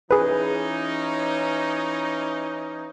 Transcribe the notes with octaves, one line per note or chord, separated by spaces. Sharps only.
E3 C#4 D#4 G#4 B4